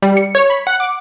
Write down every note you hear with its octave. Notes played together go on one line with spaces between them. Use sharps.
G3
C#7
C#5
B5
F#5
D6